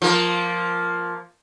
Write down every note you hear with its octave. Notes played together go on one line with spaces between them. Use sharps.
F3 A#3